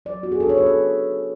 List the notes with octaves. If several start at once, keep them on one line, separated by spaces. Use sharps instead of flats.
F#3 D5
B3 F#4
G#4
D4 A4
C#5
C#3 B4
A4